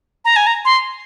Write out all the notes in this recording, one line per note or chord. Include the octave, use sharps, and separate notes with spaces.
A#5
G#5
A#5
C6